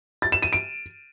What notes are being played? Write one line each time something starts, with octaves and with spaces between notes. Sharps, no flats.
A6
E7
D#7
D7